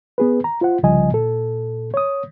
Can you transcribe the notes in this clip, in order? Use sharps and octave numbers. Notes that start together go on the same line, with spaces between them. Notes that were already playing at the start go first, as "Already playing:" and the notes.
B3 G#4 B4
A#5
F4 C5 F#5
C2 C#3 F3 G3 D#5 G#5
A#2 A4
C#5 D#6